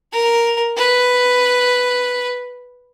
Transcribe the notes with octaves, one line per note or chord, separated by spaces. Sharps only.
A#4
B4